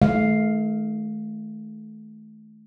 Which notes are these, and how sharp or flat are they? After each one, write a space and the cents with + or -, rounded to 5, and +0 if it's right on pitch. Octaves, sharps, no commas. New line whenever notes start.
D#3 +0 A3 -40 F5 +0